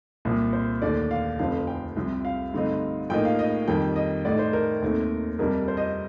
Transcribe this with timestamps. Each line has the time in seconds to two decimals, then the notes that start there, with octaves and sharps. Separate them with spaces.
0.25 C2 A#2 F3
0.53 C5
0.82 D#2 D3 A3 D5
1.11 F5
1.38 F1 F2 D3 F3 C4 F5
1.67 G5
1.96 C2 C3 F3 C4
2.25 F5
2.54 G2 D3 A3 C4 D#4
3.10 A2 F3 A#3 D#4 G5
3.25 F5
3.39 D#5
3.68 F2 D#3 G3 G5
3.96 D#5
4.25 A2 A3 D#4 D5
4.39 C5
4.53 A#4
4.82 D#2 D#3 A3 C4
5.39 F2 C3 G3 D4 A#4
5.68 C5
5.77 D#5